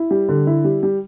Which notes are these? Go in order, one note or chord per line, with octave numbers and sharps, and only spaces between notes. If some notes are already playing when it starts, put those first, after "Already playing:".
Already playing: E4
G3
D3
E4
G3
G3